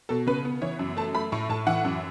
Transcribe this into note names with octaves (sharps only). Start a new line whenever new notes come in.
B2 A4
C#3 B4
B3
E3 C#5
F#2
A3 A5
A3 B5
A2 C#6
A2 A5
E3 F#5
F#2